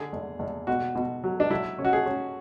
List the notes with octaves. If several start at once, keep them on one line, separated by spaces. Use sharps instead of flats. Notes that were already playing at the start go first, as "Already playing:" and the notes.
Already playing: D3 G#4
E2
E2
B2 F#4
B2
F#3
D4
F#3 E4
C#4
F#4
G#4
C#4